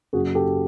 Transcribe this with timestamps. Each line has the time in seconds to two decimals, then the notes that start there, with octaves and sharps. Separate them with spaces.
0.13 F#1 F#4 G#4
0.35 G4 A4